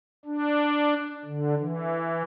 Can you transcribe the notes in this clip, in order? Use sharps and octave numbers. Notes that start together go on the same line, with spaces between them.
D4
D3
E3